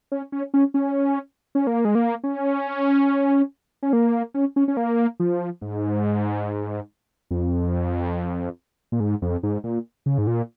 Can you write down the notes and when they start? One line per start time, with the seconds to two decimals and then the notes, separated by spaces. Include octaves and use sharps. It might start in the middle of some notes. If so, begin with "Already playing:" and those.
0.12 C#4
0.32 C#4
0.54 C#4
0.74 C#4
1.55 C#4
1.67 A#3
1.85 G#3
1.95 A#3
2.24 C#4
3.83 C#4
3.93 A#3
4.34 C#4
4.56 C#4
4.68 C#4
4.77 A#3
5.20 F3
5.62 G#2
7.31 F2
8.92 A#2
9.00 G#2
9.22 F2
9.43 G#2
9.64 A#2
10.06 C#3
10.18 G#2
10.27 A#2